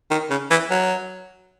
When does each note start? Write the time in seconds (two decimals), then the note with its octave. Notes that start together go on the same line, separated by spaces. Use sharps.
0.11 D#3
0.30 C#3
0.51 E3
0.71 F#3